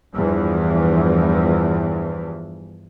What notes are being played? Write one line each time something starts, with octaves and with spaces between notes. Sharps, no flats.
E2 G2 E3 F3